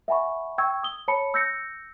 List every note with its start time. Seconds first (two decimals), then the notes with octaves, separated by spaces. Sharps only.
0.08 E5 F#5 G#5 B5 C#6
0.58 G5 C#6 E6 G#6
0.83 D#6 G7
1.08 C#5 A5 B5 C#7
1.34 E6 G6 A#6 C#7